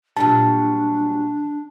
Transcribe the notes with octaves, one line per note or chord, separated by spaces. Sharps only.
A#2 F#3 G3 D4 A5